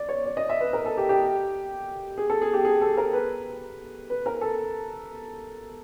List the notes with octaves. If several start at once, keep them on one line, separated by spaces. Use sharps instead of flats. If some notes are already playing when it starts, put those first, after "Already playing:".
Already playing: D5
C#5
D5
D#5
E5
B4
A#4
A4
G4
G4
G#4
A4
G#4
G4
G#4
A4
A#4
B4
B4
A#4
A4